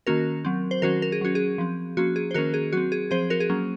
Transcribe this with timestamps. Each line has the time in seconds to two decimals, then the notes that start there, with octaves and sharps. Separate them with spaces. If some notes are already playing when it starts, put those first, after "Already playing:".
0.07 D#3 A#3 C#4 F#4 A#4
0.45 F#3 C4
0.71 C5
0.82 D#3 F#3 C#4 F#4 A#4
1.02 A#4
1.12 G#4
1.21 F#3 C#4 F#4
1.35 G#4
1.58 F3 C4
1.97 F3 A#3 C#4 F#4
2.16 G#4
2.31 C5
2.34 D#3 A#3 C#4 F#4 A#4
2.54 G#4
2.73 F#3 C4 F#4
2.92 G#4
3.11 F3 C4 G#4 C5
3.30 F#4 A#4
3.40 G#4
3.50 F#3 A#3 C#4